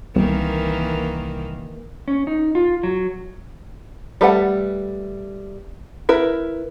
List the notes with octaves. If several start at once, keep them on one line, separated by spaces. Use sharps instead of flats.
C2 D#3 E3 A#3
C#4
D#4
F4
F#3
G3 A3 B4 F#5
E4 A#4 B4